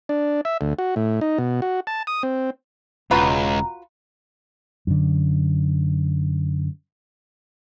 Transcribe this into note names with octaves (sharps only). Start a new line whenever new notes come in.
D4
E5
D2
F#4
A2
D#4
B2
F#4
A5
D#6
C4
E1 C#2 F4 F#4 B4 A#5
F#2 D3